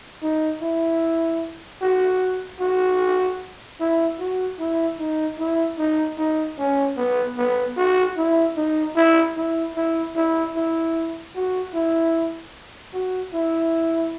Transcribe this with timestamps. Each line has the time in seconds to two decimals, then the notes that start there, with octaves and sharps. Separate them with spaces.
0.22 D#4
0.61 E4
1.82 F#4
2.60 F#4
3.80 E4
4.19 F#4
4.59 E4
4.99 D#4
5.39 E4
5.78 D#4
6.18 D#4
6.58 C#4
6.97 B3
7.37 B3
7.77 F#4
8.17 E4
8.56 D#4
8.96 E4
9.37 E4
9.75 E4
10.16 E4
10.55 E4
11.35 F#4
11.74 E4
12.94 F#4
13.33 E4